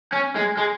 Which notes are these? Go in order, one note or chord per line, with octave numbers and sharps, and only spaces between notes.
C#4
G#3
G#3